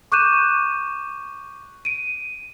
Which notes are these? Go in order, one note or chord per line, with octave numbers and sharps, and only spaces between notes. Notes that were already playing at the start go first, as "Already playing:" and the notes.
C#6 D6 F#6 G6 D#7 E7
D7 D#7